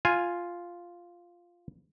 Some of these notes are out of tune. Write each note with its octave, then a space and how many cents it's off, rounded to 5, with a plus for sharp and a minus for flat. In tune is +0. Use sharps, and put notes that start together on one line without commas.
F4 +0 G#5 +0